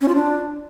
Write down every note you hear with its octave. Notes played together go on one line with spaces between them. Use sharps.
C#4
F4
D4